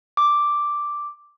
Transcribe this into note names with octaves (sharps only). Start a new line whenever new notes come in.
D6